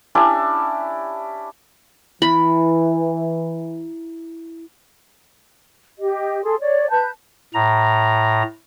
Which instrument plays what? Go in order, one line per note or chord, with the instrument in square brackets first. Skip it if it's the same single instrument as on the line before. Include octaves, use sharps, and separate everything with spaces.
[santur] C#4 D4 E4 G4
[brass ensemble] E3 [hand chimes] E4 [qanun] B5
[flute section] G4 D#5
G#4 A4 C6
C#5 D5
B4 A5 G6
[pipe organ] A2 A#5